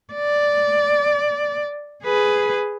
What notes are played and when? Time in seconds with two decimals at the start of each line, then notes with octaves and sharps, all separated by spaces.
0.13 D5
2.04 G#4 B4